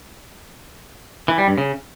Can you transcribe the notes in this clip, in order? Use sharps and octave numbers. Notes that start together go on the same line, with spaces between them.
E3
G3
G2
C#3